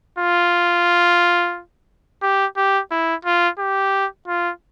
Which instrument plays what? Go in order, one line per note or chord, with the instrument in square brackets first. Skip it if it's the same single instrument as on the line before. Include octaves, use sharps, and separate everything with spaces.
[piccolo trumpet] F4
G4
G4
E4
F4
G4
F4